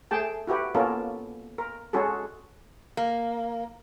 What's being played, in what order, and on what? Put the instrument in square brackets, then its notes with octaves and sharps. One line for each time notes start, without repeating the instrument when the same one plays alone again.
[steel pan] A3 G#4 G5 A5
E4 F#4 G4 B4
A#3 B3 C#4 F4 A4 A#4
A#4
G#3 C#4 F#4 G#4 A4
[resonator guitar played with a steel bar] A#3